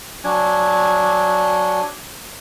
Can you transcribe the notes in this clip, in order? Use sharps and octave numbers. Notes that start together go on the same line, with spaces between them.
F#3 D4 G#5